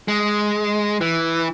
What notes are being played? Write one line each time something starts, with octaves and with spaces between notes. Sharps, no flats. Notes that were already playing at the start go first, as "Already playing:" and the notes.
G#3
E3